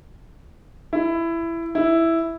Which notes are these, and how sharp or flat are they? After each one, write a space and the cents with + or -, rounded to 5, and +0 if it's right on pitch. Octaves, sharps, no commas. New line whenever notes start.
E4 +15
E4 +0